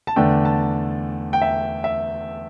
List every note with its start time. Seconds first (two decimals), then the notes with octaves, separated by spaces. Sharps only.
0.07 A5
0.16 E2 D3 A3 D4 G5
0.45 A5
1.33 G5
1.42 E5
1.84 E5